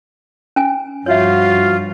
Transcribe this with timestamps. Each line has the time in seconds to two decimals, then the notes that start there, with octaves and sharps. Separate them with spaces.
0.56 C#4 G#5
1.06 G2 F3 F4 F#4 C#5 E5